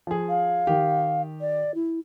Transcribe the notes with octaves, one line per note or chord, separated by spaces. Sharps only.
F3 G#4
F5
D#3 G4
D5
E4